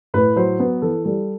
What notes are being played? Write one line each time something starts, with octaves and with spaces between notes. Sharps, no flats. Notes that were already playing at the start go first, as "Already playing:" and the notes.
A2 B4
F#3 C5
B3
E3 A4
G3 A4